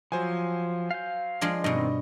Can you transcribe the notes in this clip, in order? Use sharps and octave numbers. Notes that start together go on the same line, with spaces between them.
F3 F#3 C5 G#5
F5 G6
F3 G#3 D4
G2 B2 D#3 C4 D#5